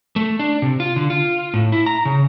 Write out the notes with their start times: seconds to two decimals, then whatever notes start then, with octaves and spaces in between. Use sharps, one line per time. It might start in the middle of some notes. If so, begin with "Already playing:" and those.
0.16 A3
0.39 D4
0.62 C3
0.80 F4
0.96 D3
1.10 F4
1.54 A2
1.72 E4
1.86 A#5
2.05 C#3